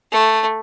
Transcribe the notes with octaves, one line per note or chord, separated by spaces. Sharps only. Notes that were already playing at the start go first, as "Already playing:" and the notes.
A3